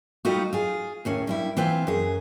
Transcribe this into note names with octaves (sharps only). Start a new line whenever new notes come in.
G3 A3 D#4 F4 F#4
F4 G#4
D#2 A2 C#4
G2 G3 E4
E3 C4 F4 B4 C5
F#2 G#4